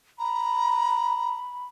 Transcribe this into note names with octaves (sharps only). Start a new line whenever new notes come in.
A#5 B5